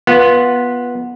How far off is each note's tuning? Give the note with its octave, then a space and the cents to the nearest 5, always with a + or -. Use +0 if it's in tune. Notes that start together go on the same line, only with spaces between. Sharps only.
B3 -15 F4 +0